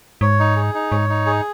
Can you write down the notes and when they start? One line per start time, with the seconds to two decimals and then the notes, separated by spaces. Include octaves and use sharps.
0.21 G#2 C#5
0.39 D#4
0.56 G#4
0.75 D#4
0.91 G#2 C#5
1.09 D#4
1.26 G#4